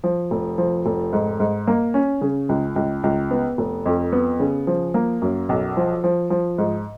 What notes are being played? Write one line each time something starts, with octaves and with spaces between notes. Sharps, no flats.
F3
F1
F3
F1
G#2
G#2
A#3
C#4
C#3
C#2
C#2
C#2
B3
F1
F2
B3
C#3
F3
A#3
F#2
B1
F3
F3
F3
G#2